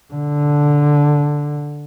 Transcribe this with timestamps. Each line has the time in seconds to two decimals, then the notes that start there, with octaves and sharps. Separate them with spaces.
0.14 D3